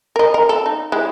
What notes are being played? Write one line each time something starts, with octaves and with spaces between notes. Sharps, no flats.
A#4 D#5
A#4
A4
D#4
G#3 E4 G4